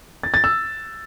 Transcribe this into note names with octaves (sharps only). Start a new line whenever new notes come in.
A6
A6
E6